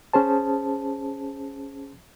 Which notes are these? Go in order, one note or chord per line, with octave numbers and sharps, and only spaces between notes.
C#4 G#4 C5 A5